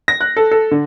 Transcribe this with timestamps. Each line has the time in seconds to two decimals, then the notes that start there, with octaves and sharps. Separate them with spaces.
0.08 A#6
0.21 F#6
0.37 A4
0.52 A4
0.71 D3